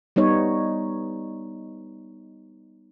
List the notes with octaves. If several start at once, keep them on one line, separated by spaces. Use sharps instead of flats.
G3 B3 D#4 C#5